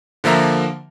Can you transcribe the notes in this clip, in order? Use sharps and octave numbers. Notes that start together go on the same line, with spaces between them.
D3 F3 A#3 E5 A#5